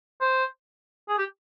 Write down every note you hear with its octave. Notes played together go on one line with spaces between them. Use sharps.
C5
G#4
G4